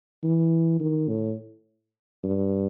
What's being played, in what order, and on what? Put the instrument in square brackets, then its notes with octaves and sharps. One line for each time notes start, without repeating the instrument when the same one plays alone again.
[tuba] E3
D#3
A2
G2